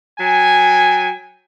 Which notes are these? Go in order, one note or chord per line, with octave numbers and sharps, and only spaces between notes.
F#3 G5 G#5